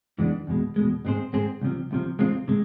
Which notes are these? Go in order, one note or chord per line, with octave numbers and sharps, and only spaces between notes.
F2 E3 G#3 B3 D4
E2 B2 G#3
E2 B2 G#3
G#2 G#3 C4 G#4 C5
G#2 G#3 C4 G#4 C5
C2 C3 F3
C2 C3 F3
E2 C3 G#3 C4 F4
C3 G#3